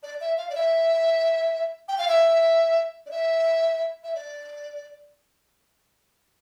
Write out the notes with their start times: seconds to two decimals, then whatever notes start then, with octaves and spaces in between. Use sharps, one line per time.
0.03 D5
0.21 E5
0.38 F5
0.50 D5
0.55 E5
1.88 G5
1.98 F5
2.08 E5
3.06 D5
3.11 E5
4.04 E5
4.15 D5